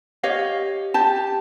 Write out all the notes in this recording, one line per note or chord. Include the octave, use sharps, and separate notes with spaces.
G4 C#5 D#5 F5
G4 A5